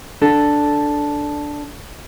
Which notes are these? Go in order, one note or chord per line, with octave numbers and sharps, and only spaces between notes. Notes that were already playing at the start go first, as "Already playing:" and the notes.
D4 A4